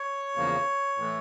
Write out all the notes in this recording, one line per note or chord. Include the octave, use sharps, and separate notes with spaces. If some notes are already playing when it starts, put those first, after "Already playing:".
Already playing: C#5
E2 C#3 F3 A#3
A2 E3 A3